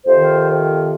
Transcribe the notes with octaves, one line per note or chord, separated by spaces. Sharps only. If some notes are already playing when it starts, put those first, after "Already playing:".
F2 C3 D#3 C5